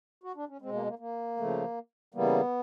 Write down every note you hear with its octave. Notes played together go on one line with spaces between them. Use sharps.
F#4
D4
C#4
B2 G#3 C4
A#3
A#3
A#3
C#3 F3 A3
C#3 E3 G3 A#3 B3